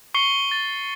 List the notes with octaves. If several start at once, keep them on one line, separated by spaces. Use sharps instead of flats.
C#6 C7 C#7 G7
A6